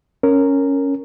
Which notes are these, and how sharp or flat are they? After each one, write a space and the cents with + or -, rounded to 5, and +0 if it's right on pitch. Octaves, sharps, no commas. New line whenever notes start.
C#4 +0 A#4 -10